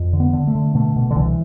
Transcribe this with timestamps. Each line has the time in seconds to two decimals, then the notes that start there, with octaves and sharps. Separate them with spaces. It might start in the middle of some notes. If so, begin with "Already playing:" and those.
Already playing: F2
0.13 D3
0.20 B3
0.33 D3
0.47 A3
0.55 D3
0.75 B2 A3
0.96 B2
1.10 D3
1.16 C2 E3